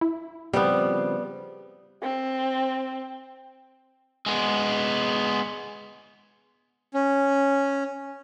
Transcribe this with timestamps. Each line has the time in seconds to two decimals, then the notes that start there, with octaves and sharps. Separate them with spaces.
0.01 E4
0.53 C#3 F3 G3 B3 C4
2.03 C4
4.26 G#3 B3
6.94 C#4